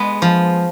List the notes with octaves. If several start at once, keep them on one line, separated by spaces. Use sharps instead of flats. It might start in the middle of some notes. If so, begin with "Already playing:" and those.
Already playing: G#3 B3
F3